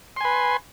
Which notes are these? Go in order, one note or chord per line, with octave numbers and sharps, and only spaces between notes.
B4 G#5 C6